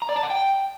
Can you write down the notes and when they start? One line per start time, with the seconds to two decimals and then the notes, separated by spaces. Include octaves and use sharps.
0.02 A#5
0.09 D5
0.16 A5
0.23 F#5
0.30 G5